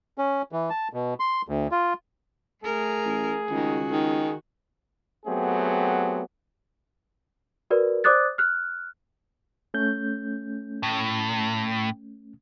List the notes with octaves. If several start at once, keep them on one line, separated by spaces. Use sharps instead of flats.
C#4
E3
A5
B2
C6
D2
F4
A3 G#4 A#4
A1
C#2 D#3 F#4
D#3
F#3 A3 B3 C4 G4 G#4
F#4 A#4 B4 D5
C5 D5 D6 D#6 F#6 A6
F6 F#6
A3 C#4 G6
A2